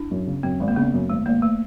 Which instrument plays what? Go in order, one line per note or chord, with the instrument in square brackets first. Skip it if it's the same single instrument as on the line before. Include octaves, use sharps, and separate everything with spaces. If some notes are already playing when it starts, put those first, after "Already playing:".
Already playing: [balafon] D4 E4
[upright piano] F#2
C#3
[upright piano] F#2 [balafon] C4
[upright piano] G#1
[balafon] A#3
[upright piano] C#3 [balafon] B3
[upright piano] F#2
[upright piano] G#1 [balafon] A3
[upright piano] G#1 [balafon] A#3
[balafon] A3